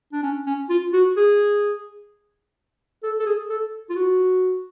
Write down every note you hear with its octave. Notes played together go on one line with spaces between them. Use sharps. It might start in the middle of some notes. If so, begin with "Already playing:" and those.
D4
C#4
C#4
F4
F#4
G#4
A4
A4
G#4
A4
F4
F#4